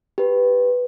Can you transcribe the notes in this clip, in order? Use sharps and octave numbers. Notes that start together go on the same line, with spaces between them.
G4 B4